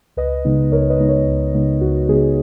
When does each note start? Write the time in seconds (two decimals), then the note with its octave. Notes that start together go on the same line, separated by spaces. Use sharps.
0.17 C#2 B4 D#5
0.45 C#3 G#3 B3 D#4
0.72 C#2 A#4 C#5
0.90 B4 D#5
0.99 C#3 G#3 B3 D#4
1.09 A#4 C#5
1.26 C#2
1.54 C#3 G#3 B3 D#4
1.81 C#2 F#4
2.08 C#3 G#3 B3 D#4 G#4